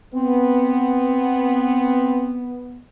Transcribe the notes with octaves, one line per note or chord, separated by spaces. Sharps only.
B3 C4